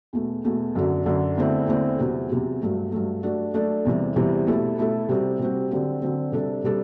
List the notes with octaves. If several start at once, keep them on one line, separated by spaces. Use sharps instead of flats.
E2 B2 A3
E2 B2 A3
F#2 D3 F#3
F#2 D3 F#3
E2 D3 A3 C4 E4
E2 D3 A3 C4 E4
E2 C3 F#3
E2 C3 F#3
G2 F#3 A3
G2 F#3 A3
F#3 A3 D4 F#4 A4
F#3 A3 D4 F#4 A4
E2 C3 E3 G3
E2 C3 E3 G3
B2 A3 E4 A4
B2 A3 E4 A4
C3 G3 C4 F#4
C3 G3 C4 F#4
D3 F#3 C4
D3 F#3 C4
C3 G3 D4 A4
C3 G3 D4 A4